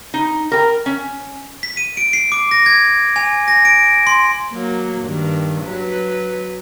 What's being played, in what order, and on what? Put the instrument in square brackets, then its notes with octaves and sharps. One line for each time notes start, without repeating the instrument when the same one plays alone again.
[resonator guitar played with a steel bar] D#4
A#4 G5
C#4
[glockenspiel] B6
D#7
D7
C7
D6
A#6
G#6
G#5
A#6
D7
C6
[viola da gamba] F#3 A#3
G2 D#3
F#3 B4